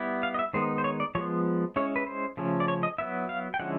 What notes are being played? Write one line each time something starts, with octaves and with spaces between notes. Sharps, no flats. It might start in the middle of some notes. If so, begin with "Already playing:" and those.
Already playing: G3 B3 E4
F5
D#5
E5
D#3 G#3 B3 D#4 C5
C5
C#5
D5
F3 G#3 B3 C#5
G#3 C#4 E4 C#5
B4
C5
C#3 F3 A3 C#4
D5
C#5
D#5
F#3 B3 E4 E5
F5
G5
D3 F3 G#3 C#4 E4 F#5